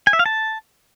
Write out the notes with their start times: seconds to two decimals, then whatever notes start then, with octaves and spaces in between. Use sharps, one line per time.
0.07 G#5
0.13 E5
0.19 F5
0.26 A5